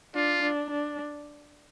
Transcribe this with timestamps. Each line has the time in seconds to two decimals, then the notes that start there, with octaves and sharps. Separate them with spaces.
0.14 D4 F4
0.42 D4
0.70 D4